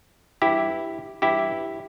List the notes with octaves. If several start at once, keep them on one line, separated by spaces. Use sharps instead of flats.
G2 E3 E4 G4
G2 E3 E4 G4